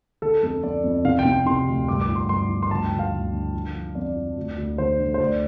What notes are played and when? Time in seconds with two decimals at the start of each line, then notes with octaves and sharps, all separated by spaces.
0.22 D3 A4
0.43 F2 A4
0.63 F2 D5
0.83 F2
1.05 C3 F5
1.19 G5
1.25 C3
1.32 G5
1.46 C3 C6
1.68 D2
1.88 G2 D6
2.01 D6
2.09 F3
2.16 C6
2.29 G2 C6
2.49 F3
2.63 C6
2.70 D2 A5
2.85 G5
2.92 D2
2.99 F5
3.13 D2
3.33 D3
3.54 F3
3.75 F3
3.95 F2 D5
4.16 F3
4.37 D2
4.58 D2
4.78 D3 C5
5.00 D3
5.14 C5
5.20 D2 D5